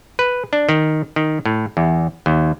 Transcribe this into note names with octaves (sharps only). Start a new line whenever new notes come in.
B4
D4
D#3
D#3
A2
E2
D#2